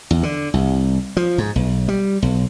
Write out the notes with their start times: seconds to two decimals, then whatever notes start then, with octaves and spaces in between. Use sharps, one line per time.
0.11 E2
0.23 D3
0.54 C2
1.17 F3
1.38 G#2
1.56 B1
1.88 G3
2.22 B1